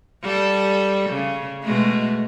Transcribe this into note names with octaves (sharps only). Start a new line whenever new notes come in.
G3 A4
C#3
B2 G#3 A3